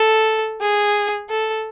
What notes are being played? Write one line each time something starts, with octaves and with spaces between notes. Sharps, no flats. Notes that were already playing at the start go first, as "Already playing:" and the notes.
Already playing: A4
G#4
A4